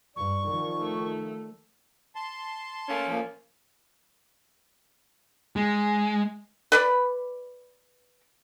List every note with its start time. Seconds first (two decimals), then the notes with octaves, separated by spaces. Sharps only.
0.16 G2 D5 C#6
0.46 D#3 F3
0.81 A3
2.15 A5 C6
2.89 A3 A#3 C#4
3.08 A#2 F3
5.56 G#3
6.72 B4 D5 B5